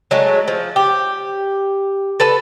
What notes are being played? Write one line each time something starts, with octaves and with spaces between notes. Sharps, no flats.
F#3 G#3 A3
F3
G4
A4 B4 A5